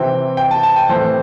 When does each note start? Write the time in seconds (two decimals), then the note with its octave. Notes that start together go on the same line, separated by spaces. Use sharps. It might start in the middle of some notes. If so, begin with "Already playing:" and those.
Already playing: C3 E3 C4 G5
0.37 G5
0.51 A5
0.63 A5
0.76 G5
0.89 A2 E3 C4 C5